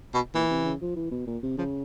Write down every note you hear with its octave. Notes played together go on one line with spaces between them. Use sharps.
B2
A#2 E3
C3
C#3
F3
E3
B2
A#2
C3
C#3 F3